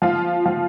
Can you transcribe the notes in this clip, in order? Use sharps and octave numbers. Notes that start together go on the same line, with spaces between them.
F3 F4
F3